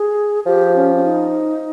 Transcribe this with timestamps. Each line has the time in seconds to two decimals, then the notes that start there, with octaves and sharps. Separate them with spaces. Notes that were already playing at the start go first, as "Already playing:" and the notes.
Already playing: G#4
0.46 F3 G4
0.76 C#4
0.96 C#4
1.04 D#4